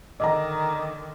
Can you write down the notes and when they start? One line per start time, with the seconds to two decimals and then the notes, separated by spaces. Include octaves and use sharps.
0.20 D3 D#3 D#5 A#5